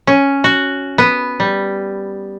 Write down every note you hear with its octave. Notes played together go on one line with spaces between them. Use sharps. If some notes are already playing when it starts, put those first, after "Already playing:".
C#4
F#4
B3
G3